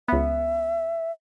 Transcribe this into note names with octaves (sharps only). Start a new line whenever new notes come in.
C#2 B3 E5